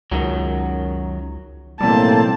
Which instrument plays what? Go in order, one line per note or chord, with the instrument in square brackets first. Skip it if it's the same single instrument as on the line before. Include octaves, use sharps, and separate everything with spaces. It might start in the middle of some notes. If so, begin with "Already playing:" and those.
[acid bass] C#2 [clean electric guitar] F#2 D#3 F#3
[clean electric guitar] B1 E3 [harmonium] A2 A#3 [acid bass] G3 [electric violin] C4 A5